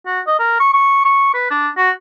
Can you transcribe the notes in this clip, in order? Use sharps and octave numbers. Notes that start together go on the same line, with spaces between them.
F#4
D#5
A#4
C#6
C#6
C#6
B4
D4
F#4